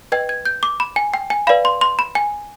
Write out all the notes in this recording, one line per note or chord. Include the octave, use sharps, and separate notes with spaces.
B4 D#5 G5 G#6
G#6
G6
D6
B5
G#5
G5
G#5
B4 D5 F5 B5
C6
C6
B5
G#5